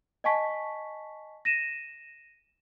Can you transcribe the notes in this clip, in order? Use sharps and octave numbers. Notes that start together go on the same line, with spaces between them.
D#5 F#5 G#5 A5 C#6 B6
A#6 D#7 E7